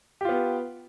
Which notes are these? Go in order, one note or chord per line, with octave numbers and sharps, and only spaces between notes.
B3 F4 G4